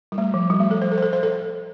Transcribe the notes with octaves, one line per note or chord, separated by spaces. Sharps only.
G3
A3
F3
G3
A3
A4
C5
A4
C5
A4
C5
A4